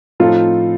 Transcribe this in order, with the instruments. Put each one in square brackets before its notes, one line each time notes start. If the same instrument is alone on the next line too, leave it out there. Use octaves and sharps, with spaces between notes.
[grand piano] A2 F3 C4 D#4 A4 [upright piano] F4